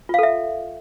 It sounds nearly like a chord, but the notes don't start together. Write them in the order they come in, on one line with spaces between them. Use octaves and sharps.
F4 F5 A4 E5